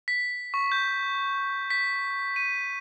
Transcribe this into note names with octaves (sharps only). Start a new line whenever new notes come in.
B6
C#6
G6
B6
D#7